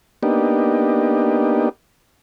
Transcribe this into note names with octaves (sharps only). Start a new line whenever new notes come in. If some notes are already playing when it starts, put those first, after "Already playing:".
A#3 B3 D4 D#4 G4